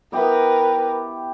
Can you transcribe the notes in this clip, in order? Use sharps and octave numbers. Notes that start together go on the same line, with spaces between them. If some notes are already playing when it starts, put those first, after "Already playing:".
B3 E4 G4 A#4 B4